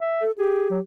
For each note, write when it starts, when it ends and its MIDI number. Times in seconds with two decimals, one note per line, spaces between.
0.01 0.24 76
0.21 0.31 69
0.38 0.80 67
0.38 0.68 68
0.70 0.80 54